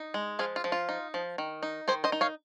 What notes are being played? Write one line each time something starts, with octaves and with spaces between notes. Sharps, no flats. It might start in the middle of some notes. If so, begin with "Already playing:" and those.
Already playing: D#4
G#3
F3 F4 G#4
F4
F3
F4
D#4
F3
D#3
D#4
D#3 G#4 C5
C5 D#5
D#4
C#5 F5